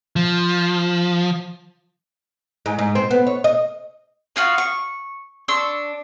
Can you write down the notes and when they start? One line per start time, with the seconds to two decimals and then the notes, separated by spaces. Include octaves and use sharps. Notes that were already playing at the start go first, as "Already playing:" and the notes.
0.16 F3
2.66 G#2
2.79 G#2
2.95 C4
3.11 B3
3.27 C#5
3.44 D#5
4.36 B3 F4 F#4 F5
4.58 C#6
5.48 D4 C6 C#6 E6